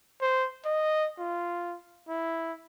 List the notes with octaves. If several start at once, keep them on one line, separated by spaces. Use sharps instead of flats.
C5
D#5
F4
E4